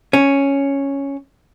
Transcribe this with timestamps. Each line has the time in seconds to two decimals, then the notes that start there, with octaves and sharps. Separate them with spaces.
0.13 C#4